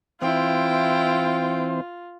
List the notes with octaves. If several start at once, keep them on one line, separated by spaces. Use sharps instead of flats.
E3 C4 E4 F4 C5 G5